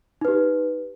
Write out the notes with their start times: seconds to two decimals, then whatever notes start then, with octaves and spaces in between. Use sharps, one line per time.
0.21 D#4
0.25 B4
0.28 G4